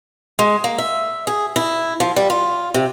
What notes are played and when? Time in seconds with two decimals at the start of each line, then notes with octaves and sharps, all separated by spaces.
0.39 G#3
0.64 A#3
0.78 E5
1.27 G#4
1.56 E4
2.00 F3
2.16 G3
2.30 F4
2.74 C3